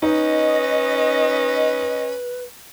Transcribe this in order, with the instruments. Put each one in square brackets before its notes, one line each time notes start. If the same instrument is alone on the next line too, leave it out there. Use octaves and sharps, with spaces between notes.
[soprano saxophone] C#4 [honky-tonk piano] D#4 [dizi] B4 [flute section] D#5